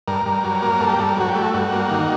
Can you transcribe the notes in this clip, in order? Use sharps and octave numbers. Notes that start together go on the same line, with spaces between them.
G2 A#4
G2
F#3
A#3
G2 A4
G4
G2 A4
A#4
F#3 F#4
G4
A3
F#4
G2 F#4
A#3
D#3